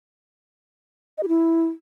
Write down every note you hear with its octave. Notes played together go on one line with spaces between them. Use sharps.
D#5
G4
E4